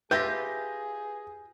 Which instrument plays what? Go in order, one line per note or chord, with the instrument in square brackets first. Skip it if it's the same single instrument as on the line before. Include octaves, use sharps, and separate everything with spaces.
[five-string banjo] F4 G4 [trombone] G#4 [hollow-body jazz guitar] B4 E5 [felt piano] G6 A#6